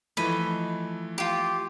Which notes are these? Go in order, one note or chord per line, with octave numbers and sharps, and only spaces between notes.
E3 F3 A3 D#5 B5
F4 G4